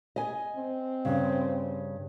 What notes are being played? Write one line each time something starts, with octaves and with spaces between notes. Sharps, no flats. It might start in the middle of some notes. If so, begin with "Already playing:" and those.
D#5 G#5
C4
G2 C#3